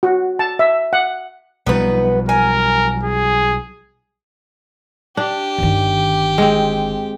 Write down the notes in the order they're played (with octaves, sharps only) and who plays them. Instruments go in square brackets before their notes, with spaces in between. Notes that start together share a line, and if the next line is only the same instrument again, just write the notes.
[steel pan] F#4
A5
E5
F#5
[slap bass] B1 F3 G3 [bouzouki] B3 D#4 B4
[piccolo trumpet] A#4 [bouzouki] G#5
[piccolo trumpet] G#4
[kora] D4 [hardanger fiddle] G4
[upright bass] G1 D#3
[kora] G#3 C4